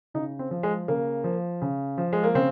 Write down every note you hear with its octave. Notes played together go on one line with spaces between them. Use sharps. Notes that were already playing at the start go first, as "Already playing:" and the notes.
C#3 D#4
C4
F3
G#3
C#3 A#3
F3
C#3
F3
G#3
A#3
C#3 C4